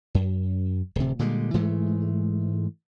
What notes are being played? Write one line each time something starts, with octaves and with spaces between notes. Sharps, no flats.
F#2
D1 C3
A#2 D3 G3 G#3
G#2 E3 G#3 A3